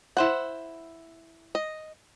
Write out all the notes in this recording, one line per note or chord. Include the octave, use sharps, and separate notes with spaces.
E4 C5 F#5
D#5